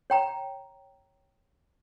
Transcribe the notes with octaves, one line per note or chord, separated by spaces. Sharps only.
C#5 G5 A#5